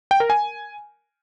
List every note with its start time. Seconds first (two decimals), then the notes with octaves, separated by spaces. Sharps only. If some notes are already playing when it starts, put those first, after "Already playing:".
0.11 G5
0.20 A#4
0.30 G#5